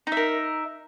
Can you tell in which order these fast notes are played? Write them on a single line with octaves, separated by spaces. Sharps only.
D#4 E5 A#4